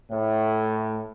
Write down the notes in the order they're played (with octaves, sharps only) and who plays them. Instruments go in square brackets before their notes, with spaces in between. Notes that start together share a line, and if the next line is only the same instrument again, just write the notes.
[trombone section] A2